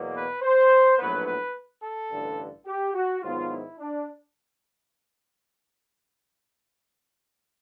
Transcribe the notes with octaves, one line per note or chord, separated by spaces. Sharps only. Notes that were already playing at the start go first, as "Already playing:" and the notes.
Already playing: E2 B2 F#3 A#3
B4
C5
A#1 A2 F#3 B3 B4
B4
A4
A1 G2 D3
G4
F#4
G#2 D#3 F#3 B3 F4
E4
D4